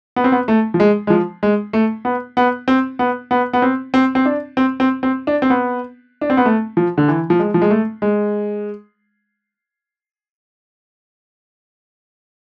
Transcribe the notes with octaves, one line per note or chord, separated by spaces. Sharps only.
B3
C4
B3
A3
F3
G#3
G#3
F3
G#3
A3
B3
B3
C4
B3
B3
B3
C4
C4
C4
D4
C4
C4
C4
D4
C4
B3
D4
C4
B3
A3
F3
D3
E3
F3
G#3
F3
G#3
A3
G#3